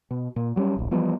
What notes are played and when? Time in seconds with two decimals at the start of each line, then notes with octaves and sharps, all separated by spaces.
0.10 B2
0.36 A#2
0.56 F#3 G3 B3 C#4
0.76 D1 A#1
0.91 E3 F3 G3 B3